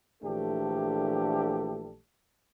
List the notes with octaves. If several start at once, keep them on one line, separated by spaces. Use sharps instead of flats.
A#1 E3 A3 D4 G4 A4